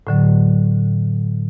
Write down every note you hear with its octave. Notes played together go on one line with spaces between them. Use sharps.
A2 D3 F#3